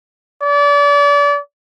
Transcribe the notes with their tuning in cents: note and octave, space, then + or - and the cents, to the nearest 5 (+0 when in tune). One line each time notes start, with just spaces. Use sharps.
D5 -35